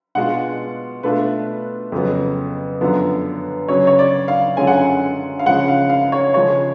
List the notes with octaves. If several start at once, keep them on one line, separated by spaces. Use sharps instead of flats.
B2 G#3 D4 F4 F#5
B2 A3 D4 F4 B4
F2 C#3 F#3 B3
F#2 D3 F3 B3 D4
C#3 F#3 C#4 C#5
C#5
D5
F5
F#2 D3 G#3 C#4 F4 G#5
F#5
G#5
F5
C#3 F3 G#3 C#4 F#5
F5
F5
C#5
C#3 F3 G#3 C#5